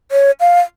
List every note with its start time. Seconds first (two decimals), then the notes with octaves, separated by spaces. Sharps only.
0.11 C#5
0.40 F5